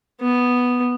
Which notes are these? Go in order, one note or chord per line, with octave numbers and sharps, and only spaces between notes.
B3